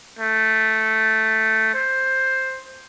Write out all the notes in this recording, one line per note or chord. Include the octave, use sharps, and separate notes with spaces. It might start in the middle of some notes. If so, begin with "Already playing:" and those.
A3
C5